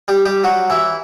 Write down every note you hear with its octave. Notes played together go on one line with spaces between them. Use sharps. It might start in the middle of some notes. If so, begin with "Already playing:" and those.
G3 G4
G3 G4
F#3 F#4
E3 E4